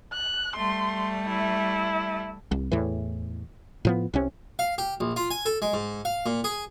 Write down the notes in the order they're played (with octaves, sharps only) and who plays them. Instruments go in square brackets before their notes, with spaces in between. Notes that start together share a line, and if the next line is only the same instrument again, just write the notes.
[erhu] F#6
[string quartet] G3 A3 [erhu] C6
[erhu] E4
[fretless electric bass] C2
E2 A2 E3
A2 F3 B3
C2 C3 C#4
[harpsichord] F5
G4
A#1
F4
G#5
A4
G#3
G#2
F5
A#2
G#4